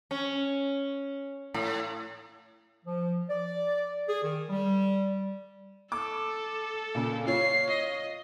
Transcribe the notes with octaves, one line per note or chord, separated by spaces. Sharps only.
C#4
A2
F3
D5
G#4
D#3
G3
A4 D6
A#2 C#3
F4 C#5 C7
D#5